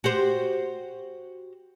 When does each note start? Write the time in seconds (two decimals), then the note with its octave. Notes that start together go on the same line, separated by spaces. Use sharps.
0.04 F#4 G4 C5